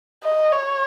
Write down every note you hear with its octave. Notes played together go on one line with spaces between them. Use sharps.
D#5
C#5